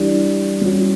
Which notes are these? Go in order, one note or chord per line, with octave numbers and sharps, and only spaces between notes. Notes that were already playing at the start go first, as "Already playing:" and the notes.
Already playing: E3 G3 D4 G4
G3 C#4 F#4